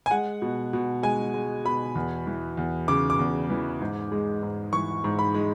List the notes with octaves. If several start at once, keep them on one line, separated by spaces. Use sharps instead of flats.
G#5
G#3 F#5
B2
B2
G#3 G#5
G#3
B2 B5
E2
E3
E2
C#3 D6
D6
E2
E3
G#2
G#3
G#2
E3 C#6
G#2
B5
G#3